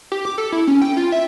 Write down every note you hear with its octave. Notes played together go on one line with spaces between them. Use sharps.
G4
D6
A4
E4
C#4
G5
F4
E5